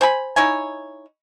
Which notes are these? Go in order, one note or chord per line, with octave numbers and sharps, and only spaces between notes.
C5 G#5 B5
D#4 E4 C#5 G#5